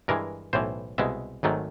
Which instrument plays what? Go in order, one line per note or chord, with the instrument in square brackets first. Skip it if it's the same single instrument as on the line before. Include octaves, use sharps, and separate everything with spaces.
[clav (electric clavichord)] G2 E3 G#3 A#4
B1 A2 E3 C5
C2 B2 G#3 E5
G#1 G#2 D#3 F#3 A3